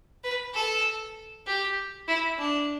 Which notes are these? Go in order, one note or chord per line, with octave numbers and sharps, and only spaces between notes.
B4
A4
G4
E4
D4